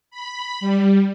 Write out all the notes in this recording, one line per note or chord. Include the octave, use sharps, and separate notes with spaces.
B5
G3